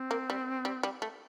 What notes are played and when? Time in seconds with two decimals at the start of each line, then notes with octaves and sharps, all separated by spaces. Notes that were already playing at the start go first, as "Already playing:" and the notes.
Already playing: C4
0.11 A#3
0.30 G3
0.65 G3
0.83 G3
1.02 A3